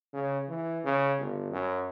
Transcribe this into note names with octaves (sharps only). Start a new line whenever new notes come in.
C#3
E3
C#3
G1
F#2